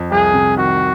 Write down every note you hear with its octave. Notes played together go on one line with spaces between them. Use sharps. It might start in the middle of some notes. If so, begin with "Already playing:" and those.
Already playing: F2
C2 G#4
C3
D#3 F#4